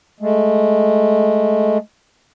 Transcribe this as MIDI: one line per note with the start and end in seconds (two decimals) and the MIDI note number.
0.20 1.78 56
0.20 1.78 57